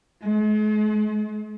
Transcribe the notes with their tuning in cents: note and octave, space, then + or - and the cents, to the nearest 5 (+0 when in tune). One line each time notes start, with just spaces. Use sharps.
G#3 +45